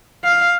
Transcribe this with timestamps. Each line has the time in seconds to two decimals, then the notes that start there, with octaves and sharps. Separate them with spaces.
0.24 F5